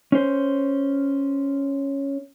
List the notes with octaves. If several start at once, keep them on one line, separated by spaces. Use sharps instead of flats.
C#4 C5